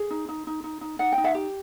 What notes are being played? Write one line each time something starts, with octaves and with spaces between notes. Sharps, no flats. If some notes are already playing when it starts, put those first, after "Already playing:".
Already playing: G#4
D#4
D#4
D#4
D#4
D#4
D#4 F#5
G5
D#4
E5 F#5
G4